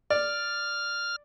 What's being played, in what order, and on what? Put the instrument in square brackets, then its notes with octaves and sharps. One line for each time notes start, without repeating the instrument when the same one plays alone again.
[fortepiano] D5 [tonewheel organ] F6